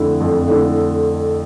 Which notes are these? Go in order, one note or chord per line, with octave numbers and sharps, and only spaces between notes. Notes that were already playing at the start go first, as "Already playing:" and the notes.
Already playing: F2 D3 A3 E4
F2
D3 A3 E4